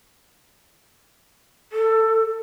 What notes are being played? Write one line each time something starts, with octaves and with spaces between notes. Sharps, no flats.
A4